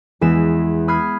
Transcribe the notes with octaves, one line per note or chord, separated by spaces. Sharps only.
E2 E3 G#3 B6 E7
B5 D#6 F6 F#6 G#6 C7